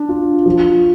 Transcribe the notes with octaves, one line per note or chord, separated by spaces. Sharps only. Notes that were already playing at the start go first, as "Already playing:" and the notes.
Already playing: D4
F4
F3